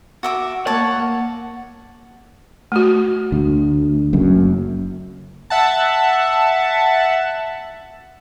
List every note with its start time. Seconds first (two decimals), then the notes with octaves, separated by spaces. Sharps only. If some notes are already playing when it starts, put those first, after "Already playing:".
0.23 F#4 E5 D6
0.67 A#3 C#5 F#5 A5
2.72 A3 F#4
3.32 D2
4.13 F#1 F#2
5.50 E5 F#5 A5